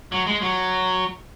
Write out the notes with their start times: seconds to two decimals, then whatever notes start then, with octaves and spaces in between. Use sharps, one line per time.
0.12 F#3
0.27 G#3
0.42 F#3